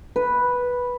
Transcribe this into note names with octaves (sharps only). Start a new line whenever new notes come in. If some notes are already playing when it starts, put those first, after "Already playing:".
B4